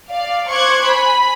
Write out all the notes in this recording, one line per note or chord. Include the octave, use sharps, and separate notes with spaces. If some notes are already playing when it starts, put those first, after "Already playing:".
D5 F5
C5 C#6 D6 F#6 G#6
G#5 B5